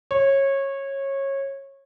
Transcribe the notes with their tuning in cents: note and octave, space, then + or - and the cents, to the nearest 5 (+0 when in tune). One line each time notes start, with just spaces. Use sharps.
C#5 -20